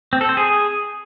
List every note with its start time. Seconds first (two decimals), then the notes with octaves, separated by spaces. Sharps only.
0.13 C4
0.21 A4
0.29 C5
0.37 G#4